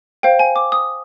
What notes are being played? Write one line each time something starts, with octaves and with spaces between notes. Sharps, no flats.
C5 F5 G5
G#5
D6
D#6